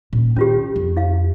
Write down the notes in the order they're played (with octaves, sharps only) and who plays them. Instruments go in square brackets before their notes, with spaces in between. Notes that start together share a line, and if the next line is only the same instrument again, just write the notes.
[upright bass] A#2 C#4
[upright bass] D#3 [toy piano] C#4 F4 G4
[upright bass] F2
[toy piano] E4 F5